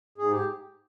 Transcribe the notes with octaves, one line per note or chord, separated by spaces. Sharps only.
G#2 G#4
G4